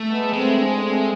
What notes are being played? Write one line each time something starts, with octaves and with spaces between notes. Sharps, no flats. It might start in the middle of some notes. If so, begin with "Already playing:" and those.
Already playing: A3
G#3 B3
G#3 A3 C4
D4
C4
B3 D4
A3 C4